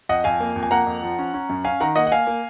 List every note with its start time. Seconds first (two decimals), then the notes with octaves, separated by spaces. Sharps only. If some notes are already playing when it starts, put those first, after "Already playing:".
0.09 F2 D#5 F#5
0.24 F2 F5 G#5
0.40 A#3
0.56 F2
0.63 G#5
0.71 A#3 F#5 A#5
0.87 F2
1.03 F3
1.19 C#4
1.34 C#4
1.49 F#2
1.65 C#4 F5 G#5
1.80 D#3 F#5 A#5
1.96 A#3 D#5 F#5
2.07 F#5
2.12 A#3 F5 G#5
2.27 A#3